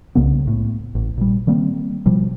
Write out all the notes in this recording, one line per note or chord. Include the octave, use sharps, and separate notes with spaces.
C2 C#3 A#3 B3
A2
A1
A#2 G3
D#3 G3 A#3 C4
B2 F3 G3